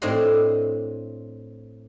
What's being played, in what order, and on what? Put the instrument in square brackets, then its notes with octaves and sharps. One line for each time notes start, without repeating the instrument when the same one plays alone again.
[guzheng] A2 C4 D4 C5 D#5 C6